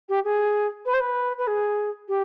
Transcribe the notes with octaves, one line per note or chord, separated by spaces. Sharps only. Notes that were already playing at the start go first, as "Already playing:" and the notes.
G4
G#4
B4
C5
B4
B4
G#4
G4